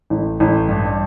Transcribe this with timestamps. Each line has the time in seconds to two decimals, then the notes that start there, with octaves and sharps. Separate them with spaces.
0.10 A1
0.40 A1
0.69 G2